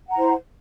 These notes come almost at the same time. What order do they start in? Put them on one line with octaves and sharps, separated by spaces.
F#5 A#5 E4 C5